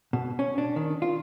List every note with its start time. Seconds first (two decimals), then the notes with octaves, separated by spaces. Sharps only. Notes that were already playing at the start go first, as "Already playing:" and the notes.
0.13 B2
0.39 C#4
0.58 D4
0.76 D#3
1.02 F4